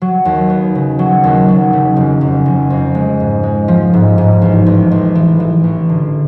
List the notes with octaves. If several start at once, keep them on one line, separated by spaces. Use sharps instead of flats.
F#3
D#2
B3
C#3
F#3
D#2
F#3
C#3
F1
F1
F1
F2
G#3
G#2
G#3
F3
G#2
G#2
A1
A1
A1
E3
E3
A1
D3